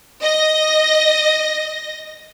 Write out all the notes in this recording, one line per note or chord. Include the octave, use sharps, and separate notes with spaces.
D#5 A#6